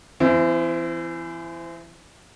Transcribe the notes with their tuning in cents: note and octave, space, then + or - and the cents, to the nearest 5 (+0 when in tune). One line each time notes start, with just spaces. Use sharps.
E3 +25 C4 -25